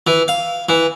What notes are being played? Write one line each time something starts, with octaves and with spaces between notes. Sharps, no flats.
E3
F5
E3